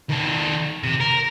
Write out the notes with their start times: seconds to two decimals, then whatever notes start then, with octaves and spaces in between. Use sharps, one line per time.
0.09 D#3 A4
0.84 C3
1.01 A#4